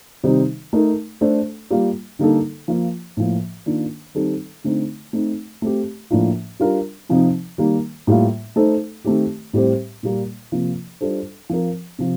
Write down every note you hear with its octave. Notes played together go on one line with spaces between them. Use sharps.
C3 D#3 G3 C4 D#4
A3 D#4 A#4
A3 D4 A4 C5
G3 A#3 F4
D3 G3 A#3 D#4 A4
F3 A#3 F4
A2 F3 A#3
D#3 A#3 D4 F4
D#3 G3 C4 D#4 A4
D3 A3 C4 D#4
A3 C4 D#4
A3 C4 G4
A2 F3 A#3 D4 F4
G3 D4 F4 A#4
C3 F3 C4 D#4
D#3 G3 A#3
A2 G3 A#3 F4
A3 D#4 A4 C5
D#3 A3 C4 G4
A2 G3 C4 G4 C5
A#2 G3 A#3
C3 F3 A#3 F4
G3 D4 F4 A4 C5
F3 C4 F4 A#4
C3 F3